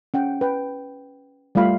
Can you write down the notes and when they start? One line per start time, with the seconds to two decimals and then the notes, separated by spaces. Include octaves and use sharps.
0.14 C#4 F#5 G5
0.41 B4 G5
1.55 G3 A3 F4 F5 B5